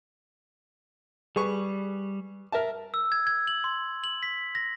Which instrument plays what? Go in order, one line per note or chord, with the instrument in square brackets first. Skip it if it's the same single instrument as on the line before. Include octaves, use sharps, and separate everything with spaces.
[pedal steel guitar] G3 [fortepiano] G#4 B4 C#6
[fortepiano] A#4 E5 A5
[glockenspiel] E6
G#6
G#6
F#7
C6
F#7
B6
A#6